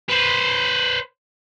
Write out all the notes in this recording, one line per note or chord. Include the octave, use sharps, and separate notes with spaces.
B4 C5